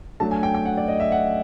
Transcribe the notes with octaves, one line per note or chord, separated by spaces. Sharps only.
F#3 A3 D4 A5
G#5
G5
G5
F#5
D5
D#5
E5
F#5